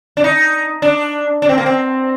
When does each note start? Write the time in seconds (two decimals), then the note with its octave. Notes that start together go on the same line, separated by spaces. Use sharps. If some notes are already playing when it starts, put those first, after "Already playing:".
0.17 D4
0.24 D#4
0.82 D4
1.42 D4
1.49 C4
1.58 A#3
1.66 C4